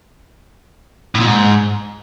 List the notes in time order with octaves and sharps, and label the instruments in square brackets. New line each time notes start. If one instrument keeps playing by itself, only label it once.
[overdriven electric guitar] A2
A#2
G#2